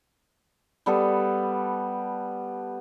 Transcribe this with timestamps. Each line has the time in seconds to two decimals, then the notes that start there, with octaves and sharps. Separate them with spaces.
0.86 G3 B3 A4